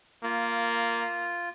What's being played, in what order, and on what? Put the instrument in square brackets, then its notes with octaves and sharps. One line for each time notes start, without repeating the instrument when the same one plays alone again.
[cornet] A#3 [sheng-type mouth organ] F4